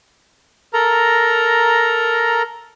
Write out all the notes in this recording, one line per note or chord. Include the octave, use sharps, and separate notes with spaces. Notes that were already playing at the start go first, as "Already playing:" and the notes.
A4 A#4 A#5